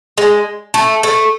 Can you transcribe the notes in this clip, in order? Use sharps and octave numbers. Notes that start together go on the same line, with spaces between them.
G#3
A3
A3